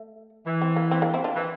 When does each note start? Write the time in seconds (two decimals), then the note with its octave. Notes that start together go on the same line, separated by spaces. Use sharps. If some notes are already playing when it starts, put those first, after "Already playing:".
Already playing: A3
0.46 E3
0.62 C4
0.76 A#3
0.91 C4
1.02 A#3 D4
1.14 C4 E4
1.24 D4 F4
1.35 E3